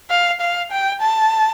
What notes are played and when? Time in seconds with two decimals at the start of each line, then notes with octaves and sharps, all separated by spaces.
0.10 F5
0.41 F5
0.71 G5
1.01 A5